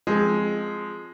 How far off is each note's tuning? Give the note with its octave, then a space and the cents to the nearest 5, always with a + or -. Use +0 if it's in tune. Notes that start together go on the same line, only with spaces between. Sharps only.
F3 +0 G#3 +0 C4 +0